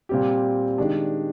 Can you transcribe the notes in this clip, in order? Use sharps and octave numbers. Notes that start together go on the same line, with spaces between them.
A#2 G3 C4 G4
D#3 G#3 D4 G4